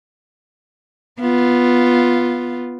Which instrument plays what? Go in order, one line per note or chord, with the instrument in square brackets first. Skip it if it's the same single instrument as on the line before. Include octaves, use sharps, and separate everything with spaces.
[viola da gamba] B3 F4